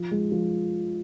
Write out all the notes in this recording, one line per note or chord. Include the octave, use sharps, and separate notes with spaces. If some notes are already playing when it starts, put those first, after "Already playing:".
Already playing: F3
G#3
F3